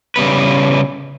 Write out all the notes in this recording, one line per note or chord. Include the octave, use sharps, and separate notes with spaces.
C#3 G3 B3 B4